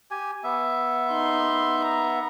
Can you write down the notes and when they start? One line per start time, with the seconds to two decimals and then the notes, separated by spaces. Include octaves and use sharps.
0.11 G4 G#5
0.44 B3 E5
1.10 D#4 C6
1.84 A#5